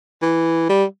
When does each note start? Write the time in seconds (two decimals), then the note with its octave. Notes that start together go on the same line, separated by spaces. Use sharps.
0.22 E3
0.69 G3